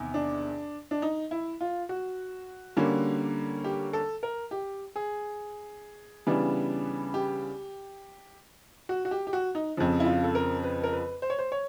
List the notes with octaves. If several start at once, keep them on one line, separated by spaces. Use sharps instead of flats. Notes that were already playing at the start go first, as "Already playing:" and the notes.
Already playing: E2 C3 D#3
D4
D4
D#4
E4
F4
F#4
D3 G3 A#3 C#4
G4
A4
A#4
G4
G#4
C#3 E3 G3 B3 D4
G4
F#4
F#4
G4
G4
F#4
D#4
F2 C#3 F3
E4
F4
A4
A#4
B4
A#4
B4
C5
C#5
C5
C#5